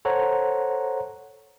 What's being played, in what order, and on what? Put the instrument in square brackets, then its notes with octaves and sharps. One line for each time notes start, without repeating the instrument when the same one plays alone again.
[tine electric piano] A4 C5 C#5 F#5 A#5